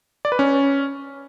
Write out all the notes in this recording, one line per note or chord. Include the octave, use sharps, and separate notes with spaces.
D5
B4
C#4